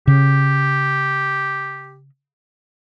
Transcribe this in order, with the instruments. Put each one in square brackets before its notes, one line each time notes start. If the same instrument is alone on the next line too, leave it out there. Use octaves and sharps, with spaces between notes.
[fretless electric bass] C#3 [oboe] G4